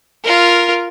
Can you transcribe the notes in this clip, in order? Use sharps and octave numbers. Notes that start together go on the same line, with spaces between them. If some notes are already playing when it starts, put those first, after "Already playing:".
F4 A#4